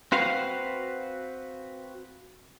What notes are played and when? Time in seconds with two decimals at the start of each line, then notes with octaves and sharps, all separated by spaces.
0.12 C4 F#4 B4 F5